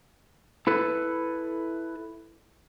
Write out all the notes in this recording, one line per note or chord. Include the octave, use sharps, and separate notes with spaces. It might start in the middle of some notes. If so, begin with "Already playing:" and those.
E4 A4 B4